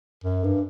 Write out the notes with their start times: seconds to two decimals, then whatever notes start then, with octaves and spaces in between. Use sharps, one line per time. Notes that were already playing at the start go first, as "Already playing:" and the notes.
0.24 F#2
0.44 G2